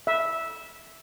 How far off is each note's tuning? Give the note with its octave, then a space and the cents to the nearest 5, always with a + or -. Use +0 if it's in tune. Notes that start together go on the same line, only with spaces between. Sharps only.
E5 -10